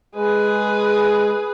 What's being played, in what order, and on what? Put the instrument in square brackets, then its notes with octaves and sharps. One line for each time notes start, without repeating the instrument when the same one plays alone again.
[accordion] G#3 [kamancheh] G#4 B4